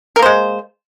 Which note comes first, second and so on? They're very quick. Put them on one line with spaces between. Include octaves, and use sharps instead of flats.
A#4 A#3 C5 G#3